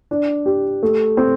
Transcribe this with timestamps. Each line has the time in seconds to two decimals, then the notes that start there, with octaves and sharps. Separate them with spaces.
0.11 D4
0.46 G4
0.83 A3
1.17 C4